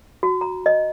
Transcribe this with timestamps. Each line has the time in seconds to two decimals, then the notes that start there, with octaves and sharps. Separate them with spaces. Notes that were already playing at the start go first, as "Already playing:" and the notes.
0.23 F#4
0.41 A#5
0.66 D#5